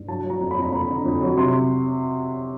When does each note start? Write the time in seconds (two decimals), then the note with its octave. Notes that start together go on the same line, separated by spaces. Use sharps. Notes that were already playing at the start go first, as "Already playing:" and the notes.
Already playing: G2
0.08 F#3 A5
0.24 F#3
0.30 A#5
0.40 F2
0.51 B5
0.57 F2
0.62 A#5
0.72 F2 B5
0.89 D3
1.05 F2
1.22 F#3
1.38 C3 C6